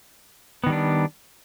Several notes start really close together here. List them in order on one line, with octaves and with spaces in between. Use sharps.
B3 D#3 G3 D4